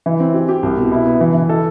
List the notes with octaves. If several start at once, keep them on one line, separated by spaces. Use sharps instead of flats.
E3
C4
G4
G4
C2
B2
E4
B3
E3
E3
A4